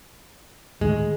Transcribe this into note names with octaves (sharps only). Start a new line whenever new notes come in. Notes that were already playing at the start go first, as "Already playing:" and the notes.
D2 A2 D#3 G#3